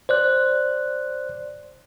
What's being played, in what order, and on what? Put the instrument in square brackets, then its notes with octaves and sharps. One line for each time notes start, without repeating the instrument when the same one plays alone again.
[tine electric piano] C5 D5 F#6